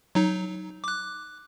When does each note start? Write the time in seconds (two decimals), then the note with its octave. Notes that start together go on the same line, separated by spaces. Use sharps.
0.15 F#3 D#4
0.84 D6 F#6